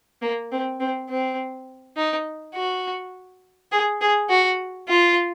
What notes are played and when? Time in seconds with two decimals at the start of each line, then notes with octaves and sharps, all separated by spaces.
0.22 A#3
0.52 C4
0.80 C4
1.10 C4
1.97 D#4
2.55 F#4
3.72 G#4
4.01 G#4
4.30 F#4
4.89 F4